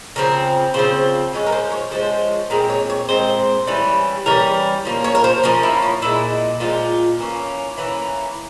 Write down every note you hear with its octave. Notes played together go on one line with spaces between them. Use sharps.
C#3 F3 C4 A#4
C#3 F3 C4 C5
F3 G#3 C#4 C#5
A#4
C5
C#5
F3 G#3 C#4 C5
A#2 G#3 C4 A#4
C#5
C#5
A#2 G#3 C4 C5
E3 G3 C#4
E3 G3 C#4 A#4
F3 A#3 C#4
C#5
A#4
C5
F3 A#3 C#4 A#4
E4
C#4
A#2 F3 G#3 E4
A#2 F3 G#3 F4
E3 A#3 C#4
E3 A#3 C#4